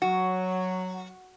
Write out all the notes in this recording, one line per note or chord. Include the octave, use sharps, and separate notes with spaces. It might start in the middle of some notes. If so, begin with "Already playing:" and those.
F#3 F#4